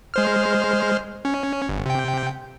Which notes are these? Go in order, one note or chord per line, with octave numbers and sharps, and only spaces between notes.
G#3 C5 F6
C#4
G1
C3 G5